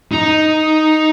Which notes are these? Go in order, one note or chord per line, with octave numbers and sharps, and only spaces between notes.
D#4